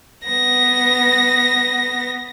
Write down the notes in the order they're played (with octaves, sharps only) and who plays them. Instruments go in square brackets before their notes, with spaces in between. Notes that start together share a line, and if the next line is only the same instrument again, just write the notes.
[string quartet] B3 A#6